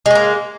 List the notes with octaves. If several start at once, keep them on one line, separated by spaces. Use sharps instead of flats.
G#3 A#3 C#4